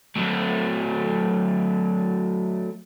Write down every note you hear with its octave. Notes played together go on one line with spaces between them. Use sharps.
F#3 A3